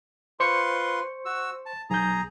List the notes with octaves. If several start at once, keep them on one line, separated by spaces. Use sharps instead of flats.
F4 B4 C5 C6 C#6 C#7
F#4 E6
A5
B1 G#4 A#5 G6